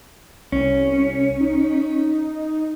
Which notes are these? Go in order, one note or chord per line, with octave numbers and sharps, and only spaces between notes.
C2 C#4
D#4